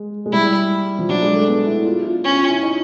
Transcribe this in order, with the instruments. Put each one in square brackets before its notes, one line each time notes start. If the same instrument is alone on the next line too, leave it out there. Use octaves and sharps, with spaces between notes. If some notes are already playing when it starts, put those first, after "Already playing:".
Already playing: [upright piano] G#3
G#3
[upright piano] G3 [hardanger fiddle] E4
[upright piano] F3
[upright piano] F#3 [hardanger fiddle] D4
[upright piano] G#3
A3
B3
E4
F4
F4
[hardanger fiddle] C#4 [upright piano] F4
[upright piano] F4
E4
D#4